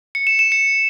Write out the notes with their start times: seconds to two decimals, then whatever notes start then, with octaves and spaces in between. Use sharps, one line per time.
0.15 C#7
0.27 E7
0.39 E7
0.52 C#7